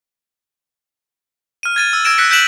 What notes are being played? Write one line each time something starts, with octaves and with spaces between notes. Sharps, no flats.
F6 D#7
G#6 A6 D#7
E6
E6 G#6 A#6 D7 E7
F#6 G#6 A#6 B6 C#7
F#6 G6 B6 D7 E7 F#7